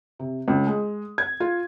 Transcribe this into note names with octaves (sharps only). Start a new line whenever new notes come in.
C3
C#2
G#3
G#6
F4